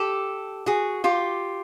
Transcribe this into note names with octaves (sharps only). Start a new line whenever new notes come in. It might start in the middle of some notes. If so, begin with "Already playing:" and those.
Already playing: G4 A4
F#4 G#4
F4 G4